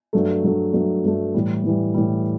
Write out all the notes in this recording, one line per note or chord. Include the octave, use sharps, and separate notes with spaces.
G2 F#3 A3
G2 F#3 A3
G2 F#3 A3
G2 F#3 A3
A2 E3 G3
A2 E3 G3
A2 E3 G3